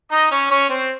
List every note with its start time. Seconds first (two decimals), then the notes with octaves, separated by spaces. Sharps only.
0.12 D#4 D#5
0.31 C#4 C#5
0.51 C#4 C#5
0.70 C4 C5